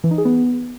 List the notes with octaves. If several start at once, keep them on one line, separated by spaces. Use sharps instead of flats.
E3
D#4
G#4
B3